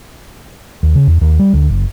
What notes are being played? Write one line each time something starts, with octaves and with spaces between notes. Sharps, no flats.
D#2
C#3
E2
D#2
G3
D2
F#1